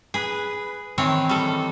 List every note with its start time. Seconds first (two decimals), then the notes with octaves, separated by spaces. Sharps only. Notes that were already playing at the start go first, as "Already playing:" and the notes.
0.14 G#4 B4
0.98 D#3 E3 C4 C#5
1.29 G3 A4